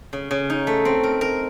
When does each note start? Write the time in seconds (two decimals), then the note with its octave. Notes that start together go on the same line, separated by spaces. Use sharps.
0.13 C#3
0.31 C#3
0.50 D#4
0.67 A3
0.85 C4
1.03 A#4
1.21 A#4